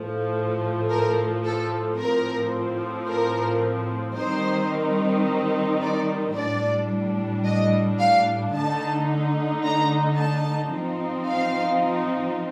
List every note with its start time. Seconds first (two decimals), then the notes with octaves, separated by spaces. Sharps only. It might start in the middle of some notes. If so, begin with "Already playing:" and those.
Already playing: A2 F3 A3
0.90 A#4
1.45 A4
1.99 A2 F3 C4 A#4
3.08 A#4
4.17 D#3 G3 C4 D#4 C5
5.81 D5
6.36 A2 G3 D4 D5
7.45 D#5
8.00 F5
8.54 D3 A3 D#4 A5
9.64 A#5
10.19 A5
10.73 F3 C4 D#4
11.28 F5